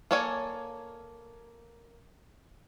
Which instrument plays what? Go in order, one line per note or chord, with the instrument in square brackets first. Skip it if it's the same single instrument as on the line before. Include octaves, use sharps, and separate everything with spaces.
[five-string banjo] A#3 A4 C#5 D5 G#5